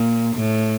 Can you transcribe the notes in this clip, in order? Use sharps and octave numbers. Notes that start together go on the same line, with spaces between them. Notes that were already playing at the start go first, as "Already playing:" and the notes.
Already playing: A#2
A2